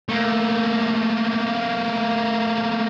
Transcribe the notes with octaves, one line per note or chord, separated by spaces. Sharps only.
A3 A#3